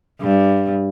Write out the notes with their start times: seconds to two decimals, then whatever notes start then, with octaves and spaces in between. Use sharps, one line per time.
0.21 G2